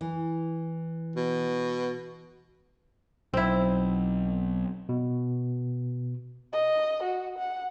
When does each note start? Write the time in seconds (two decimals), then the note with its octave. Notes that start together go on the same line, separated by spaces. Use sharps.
0.01 E3
1.16 B2
3.34 B1 C4 E4
4.89 B2
6.53 D#5
7.03 F#4
7.38 F#5